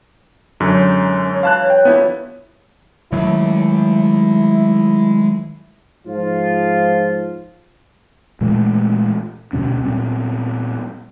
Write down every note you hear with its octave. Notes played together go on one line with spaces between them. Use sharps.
F#2 D3 G#3 C#4 D#4
C#4
E3 F#3 F5 A5 F#6
G5
G2 A#2 D3 B3 E4
D#3 F#3 G#3 A3 E4 C#5
G#2 F3 F4
A#2 E3 G#3 A3
D2 B2 A3 C#4
A#2 G3 B3 C4